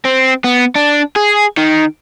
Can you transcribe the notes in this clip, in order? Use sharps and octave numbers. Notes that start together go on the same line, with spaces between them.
C4
B3
D4
G#4
D#3